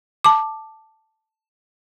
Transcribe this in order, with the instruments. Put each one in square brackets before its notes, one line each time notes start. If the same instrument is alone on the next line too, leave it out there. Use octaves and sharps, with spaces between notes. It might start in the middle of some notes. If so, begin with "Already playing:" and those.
[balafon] A5 D6